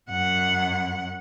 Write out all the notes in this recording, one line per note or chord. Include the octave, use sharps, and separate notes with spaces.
F#2 F#5